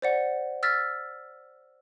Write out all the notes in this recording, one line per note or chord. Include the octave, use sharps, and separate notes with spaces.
C5 D5 F#5
E6 F6 A6 B6